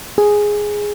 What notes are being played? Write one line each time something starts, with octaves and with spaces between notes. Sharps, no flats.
G#4